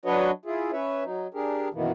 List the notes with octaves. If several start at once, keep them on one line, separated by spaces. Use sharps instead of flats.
F#3 D4 F#4 B4 C#5 D#5
E4 F4 G#4
C#4 B4 C#5 E5
F#3 D#4
D4 G4 G#4 A#4
F#2 B2 D#3 E3 A#3 B3